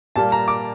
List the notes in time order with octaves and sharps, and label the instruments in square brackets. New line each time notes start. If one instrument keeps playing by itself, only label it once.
[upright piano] A#2 G3 A#3 A5
A#5
D6